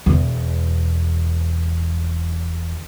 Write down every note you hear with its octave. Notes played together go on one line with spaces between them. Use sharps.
E1 E2